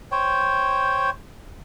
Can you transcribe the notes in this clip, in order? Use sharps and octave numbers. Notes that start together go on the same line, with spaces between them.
C5 C#5 G5